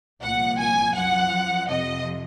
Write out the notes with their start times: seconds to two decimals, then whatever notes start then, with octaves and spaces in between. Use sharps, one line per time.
0.22 C2 A#2 F3 F#5
0.59 G#5
0.95 F#2 F3 F#5
1.69 F2 C3 F3 D#5